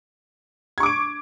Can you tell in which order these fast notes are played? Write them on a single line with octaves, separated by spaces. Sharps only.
G#6 C#6 D6 D7